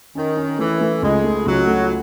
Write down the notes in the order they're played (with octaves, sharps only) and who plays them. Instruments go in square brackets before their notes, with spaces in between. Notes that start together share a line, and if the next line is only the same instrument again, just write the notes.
[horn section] D#3 [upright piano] C#4
[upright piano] C#4
[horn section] E3 [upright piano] A3
[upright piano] A3
[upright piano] C#2 [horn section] G#3
[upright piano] A3
[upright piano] C#2 [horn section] F#3
[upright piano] A3